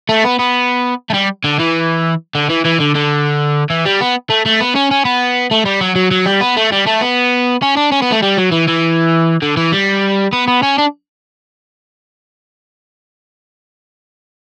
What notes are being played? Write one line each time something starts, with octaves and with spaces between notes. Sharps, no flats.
A3
B3
B3
A3
G3
D3
E3
D3
E3
E3
D3
D3
E3
G3
B3
A3
A3
B3
C#4
C#4
B3
A3
G3
F#3
F#3
F#3
G3
B3
A3
G3
A3
B3
C#4
D4
C#4
B3
A3
G3
F#3
E3
E3
D3
E3
G3
B3
B3
C#4
D4